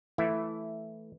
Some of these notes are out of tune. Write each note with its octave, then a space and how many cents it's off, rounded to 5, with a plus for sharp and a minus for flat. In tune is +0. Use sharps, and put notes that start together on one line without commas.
E3 +0 A3 +0 E4 +0